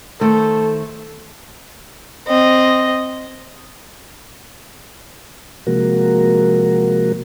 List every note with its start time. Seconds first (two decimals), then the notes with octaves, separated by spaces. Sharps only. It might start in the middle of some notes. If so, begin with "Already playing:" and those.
0.21 D#3 A3 A4 C5
2.28 C4 D#5
5.67 C3 F3 G#3 A#3 F#4 A#4